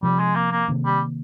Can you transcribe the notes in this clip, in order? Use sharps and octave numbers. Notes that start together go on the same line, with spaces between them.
C3 F3 G3 C4
G#3
A#3
A#3
C3 D#3 A#3
G3